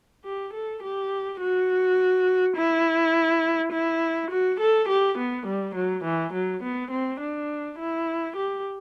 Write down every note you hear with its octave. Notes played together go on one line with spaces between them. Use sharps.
G4
A4
G4
F#4
E4
E4
F#4
A4
G4
B3
G3
F#3
E3
F#3
B3
C4
D4
E4
G4